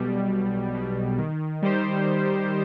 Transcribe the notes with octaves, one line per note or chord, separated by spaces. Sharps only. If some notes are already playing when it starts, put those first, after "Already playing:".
Already playing: B1 B2 G3
B1
B2 G3
D#3
G3 D#4 G4 C5
D#3